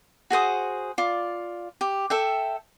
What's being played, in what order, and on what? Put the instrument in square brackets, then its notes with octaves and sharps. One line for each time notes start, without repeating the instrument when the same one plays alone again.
[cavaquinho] F#4 G#4 C5 D#6
F4 D5
G4
A4 E5 G5